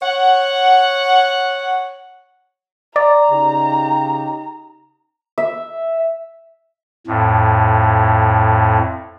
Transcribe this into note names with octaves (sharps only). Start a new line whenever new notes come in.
C#5 F#5
D5 A#5
C#3 D#4 G4
E5
F2 A2